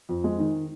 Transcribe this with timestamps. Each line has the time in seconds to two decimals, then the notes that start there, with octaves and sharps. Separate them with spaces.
0.09 F2
0.24 G#3
0.39 D#3